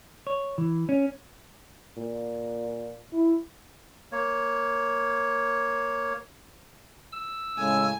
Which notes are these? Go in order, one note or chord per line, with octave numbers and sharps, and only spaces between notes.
C#5
E3
C#4
A#2
E4
A#3 C#5
E6
A2 C#3 G#3 G#5